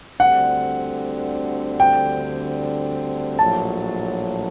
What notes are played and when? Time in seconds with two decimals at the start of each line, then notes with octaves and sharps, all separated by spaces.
0.19 D2 D3 G3 C4 F#5
1.80 G5
3.39 A#1 A2 F#3 A5